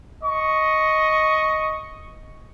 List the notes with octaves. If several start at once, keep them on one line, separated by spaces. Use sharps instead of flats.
D#5 C#6